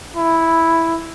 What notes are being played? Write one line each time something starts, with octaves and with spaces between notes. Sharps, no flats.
E4